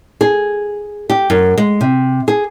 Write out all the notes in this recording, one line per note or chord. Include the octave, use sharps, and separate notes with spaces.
G#4
G4
F#2
G#3
C3
G#4